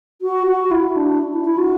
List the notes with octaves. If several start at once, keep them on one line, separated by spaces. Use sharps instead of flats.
F#4
F#4
E4
D4
E4
E4
F#4